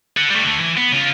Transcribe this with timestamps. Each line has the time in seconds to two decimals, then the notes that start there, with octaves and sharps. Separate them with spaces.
0.17 A4 F#5
0.30 G3 A3
0.44 D3 A3
0.59 E3
0.77 B3
0.92 C#3 F4